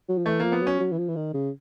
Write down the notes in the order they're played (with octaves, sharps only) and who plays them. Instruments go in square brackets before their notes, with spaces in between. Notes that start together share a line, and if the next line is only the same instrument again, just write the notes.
[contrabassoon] F#3
F3
[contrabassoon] E3 [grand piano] A3
[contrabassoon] F3 [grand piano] A#3
[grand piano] B3
[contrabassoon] F#3 [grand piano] C#4
[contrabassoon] F#3
E3
F3
E3
D#3
C#3